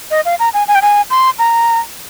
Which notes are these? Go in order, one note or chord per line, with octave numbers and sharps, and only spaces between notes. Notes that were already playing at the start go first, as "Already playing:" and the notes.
D#5
F5
A#5
G#5
G#5
G5
G#5
C6
A#5